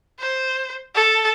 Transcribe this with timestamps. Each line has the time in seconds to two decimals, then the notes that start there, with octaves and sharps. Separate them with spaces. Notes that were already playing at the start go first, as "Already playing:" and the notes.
0.20 C5
0.95 A4